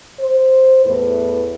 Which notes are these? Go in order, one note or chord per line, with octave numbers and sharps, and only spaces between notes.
C5
E2 A2 E4 B4